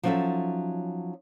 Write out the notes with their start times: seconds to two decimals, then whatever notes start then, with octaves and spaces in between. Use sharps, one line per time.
0.03 F3 F#3 C#4 D#4 A4 E5